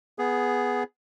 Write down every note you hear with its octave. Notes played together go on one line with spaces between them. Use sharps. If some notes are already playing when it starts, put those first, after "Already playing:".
B3 G#4